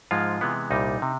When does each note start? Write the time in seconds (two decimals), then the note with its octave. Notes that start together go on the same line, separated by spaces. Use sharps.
0.11 G#2 F3 G#3 F4
0.41 C3 E3 G#3 B3
0.71 C2 A#2 G3 D#4
1.02 C3